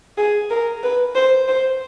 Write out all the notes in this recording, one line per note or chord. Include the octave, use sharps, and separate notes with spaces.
G#4
A#4
B4
C5
C5